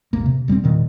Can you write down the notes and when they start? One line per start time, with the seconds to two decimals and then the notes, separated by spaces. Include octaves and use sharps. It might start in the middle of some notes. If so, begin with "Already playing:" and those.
0.13 E1 A1 A#3
0.26 C3
0.48 E1 G3 G#3 C4
0.64 E1 A#2 D#3